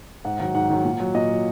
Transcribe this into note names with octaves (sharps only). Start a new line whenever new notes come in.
G#2 F#5
D#3 F#3 F#5
G#2 F#5
D#3 F#3
A#2
F#3
A#2 D#5
F#3